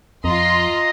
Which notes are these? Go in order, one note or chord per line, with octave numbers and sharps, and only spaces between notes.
F2 F4 D#5 A#5 C6